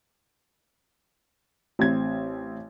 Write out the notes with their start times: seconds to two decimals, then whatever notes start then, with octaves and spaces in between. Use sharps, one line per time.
1.79 A1 C4 G#6